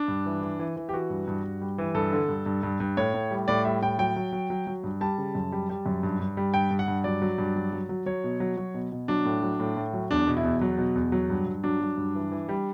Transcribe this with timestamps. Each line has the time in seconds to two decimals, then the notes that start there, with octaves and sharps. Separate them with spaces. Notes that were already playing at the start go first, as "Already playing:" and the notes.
Already playing: D4
0.08 G2
0.26 E3
0.42 E3
0.59 E3
0.77 E3
0.89 G4
0.93 E3 F#4
1.10 G2
1.27 G2
1.44 G2
1.61 G3
1.78 E3
1.94 G2 A4
2.13 D3
2.29 G2
2.46 G2
2.63 G2
2.80 G2
2.97 A2 C#5
3.14 A2
3.31 G3
3.48 A2 D5
3.65 G3 E5
3.82 A2 G5
3.98 F#3 G5
4.16 F#3
4.33 F#3
4.50 F#3
4.67 F#3
4.84 G2
5.01 G3 A5
5.18 C#3
5.35 F#2
5.52 G3
5.69 G3
5.86 F#2
6.03 G2
6.20 G2
6.37 G3
6.54 G2 G5
6.71 G2
6.79 F#5
6.88 G2
7.04 F#3 D5
7.22 F#3
7.38 G2
7.56 F#3
7.73 F#3
7.89 F#3
8.06 F#3 C#5
8.24 B2
8.40 F#3
8.57 F#3
8.74 B2
8.92 B2
9.08 F#3 D4
9.25 A2
9.42 F#3
9.60 A2
9.77 A2
9.93 F#3
10.11 E2 D4
10.27 B2
10.37 E4
10.44 E2
10.61 F#3
10.78 B2
10.96 E2
11.12 F#3
11.30 G2
11.47 G2
11.64 F#3 D4
11.81 F#3
11.98 G2
12.15 E3
12.31 E3
12.49 G3